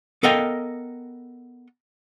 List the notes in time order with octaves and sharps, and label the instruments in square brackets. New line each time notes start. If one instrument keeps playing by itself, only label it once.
[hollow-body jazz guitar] B3 A4 A#4 D#5 F5 G5